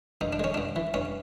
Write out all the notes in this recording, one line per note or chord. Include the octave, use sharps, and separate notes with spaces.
G2 D#4
D4
G#3 C#4
G2 D4
E3
G2 C#4